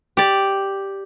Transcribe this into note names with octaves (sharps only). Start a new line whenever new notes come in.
G4 D5